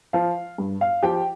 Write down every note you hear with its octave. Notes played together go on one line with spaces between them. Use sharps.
F3 F5
G2
F5
F3 G4 G5